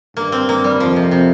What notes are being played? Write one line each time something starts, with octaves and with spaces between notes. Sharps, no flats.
G2 A#3
C4
A#3
G3
F2 F3
C3
C3